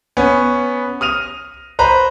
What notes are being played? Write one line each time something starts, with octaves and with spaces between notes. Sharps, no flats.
B3 C#4
D#6 F6 D#7 F7
B4 C5 A#5